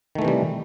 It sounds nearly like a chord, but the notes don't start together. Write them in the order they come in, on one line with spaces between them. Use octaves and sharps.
D#3 A3 E3 C3 G3